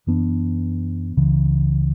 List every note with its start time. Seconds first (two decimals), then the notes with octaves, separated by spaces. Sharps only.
0.07 F#2 E3 B3 D4
1.17 C#2 C#3 E3